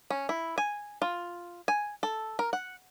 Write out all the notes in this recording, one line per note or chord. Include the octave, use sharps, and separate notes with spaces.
C#4
E4
G#5
F4
G#5
A4
A#4
F#5